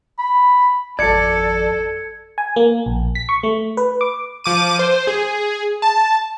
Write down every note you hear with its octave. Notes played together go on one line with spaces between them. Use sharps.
B5
G#1 F2 A4 D5 G#6 C#7
G#5
A#3
A#1
B6
C#6
A3
B4
D6
F3 D6 D#7
C5
G#4
A5